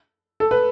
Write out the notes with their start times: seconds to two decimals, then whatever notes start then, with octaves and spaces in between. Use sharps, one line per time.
0.40 A4
0.51 B4